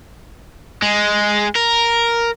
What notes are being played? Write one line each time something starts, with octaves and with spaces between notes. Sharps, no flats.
G#3
A#4